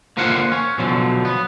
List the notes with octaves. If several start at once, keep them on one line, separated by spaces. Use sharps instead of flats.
D3 A#3 F4 C5 F5 F#5
C#4
B2 D3 F3 F#3
B3